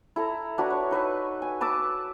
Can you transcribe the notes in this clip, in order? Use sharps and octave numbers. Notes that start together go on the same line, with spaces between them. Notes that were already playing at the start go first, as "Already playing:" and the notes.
E4 A4 A#5
D4 F#4 B4 A#5
C#5
D#4 B4 E5 A5
G#5
B4 A5 D6 E6